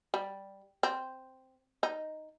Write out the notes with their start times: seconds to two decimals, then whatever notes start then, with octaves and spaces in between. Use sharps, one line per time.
0.14 G3
0.83 C4
1.83 D#4